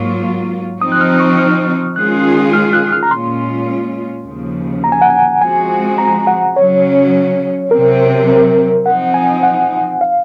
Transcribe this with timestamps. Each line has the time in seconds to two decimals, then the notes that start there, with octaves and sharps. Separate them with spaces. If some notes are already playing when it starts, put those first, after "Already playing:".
Already playing: G#2 F#3 A#3 F4 C#6
0.81 F3 C4 D#4 D#6
0.92 F#6
1.01 F6
1.20 C#6
1.39 F6
1.96 D#3 G#3 C#4 F4 G#4 F#6
2.53 F6
2.73 F#6
2.92 F6
3.03 A#5
3.11 A#2 G#3 C#4 F4 C6
4.26 D#2 C#3 F3
4.84 A#5
4.92 G#5
5.02 F#5
5.10 G#5
5.41 F3 G#3 C4 F#4 G#5
5.98 A#5
6.27 F#5
6.56 C#3 F#3 C#4 C#5
7.71 C3 F#3 C4 A#4
8.28 A#4
8.86 F3 C4 D#4 F#5
9.14 G#5
9.43 F#5
10.01 F5